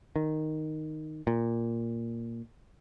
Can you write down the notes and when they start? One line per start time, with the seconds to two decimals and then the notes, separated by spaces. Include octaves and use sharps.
0.16 D#3
1.27 A#2